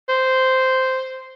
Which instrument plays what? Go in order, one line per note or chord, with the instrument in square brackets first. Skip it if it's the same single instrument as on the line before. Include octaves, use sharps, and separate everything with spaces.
[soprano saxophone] C5